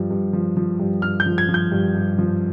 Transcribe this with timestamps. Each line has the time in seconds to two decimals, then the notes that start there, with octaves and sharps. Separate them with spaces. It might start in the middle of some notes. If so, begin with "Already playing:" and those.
Already playing: G2 F3
0.11 G2
0.33 F3
0.57 F3
0.80 G2
1.02 G2 F6
1.20 G6
1.26 F3
1.38 G#6
1.49 F3
1.54 G6
1.72 G2
1.95 G2
2.18 F3